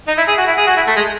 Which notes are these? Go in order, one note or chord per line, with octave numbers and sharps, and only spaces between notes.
D#4
E4
G#4
F#4
E4
G#4
F#4
E4
A3
G#3